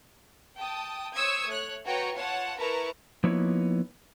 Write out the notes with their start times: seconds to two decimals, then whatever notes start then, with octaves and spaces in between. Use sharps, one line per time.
0.57 G5 A5 D#6
1.15 C5 C#5 C#6 D#6 E6 G#6
1.48 A3 C#5 F#6
1.86 F#4 B4 C#5 G5 A#5 C#6
2.16 F4 C#5 F#5 A5
2.59 E4 A#4 B4 A5 A#5 C#6
3.24 F3 A#3 B3 D#4 E4 C#5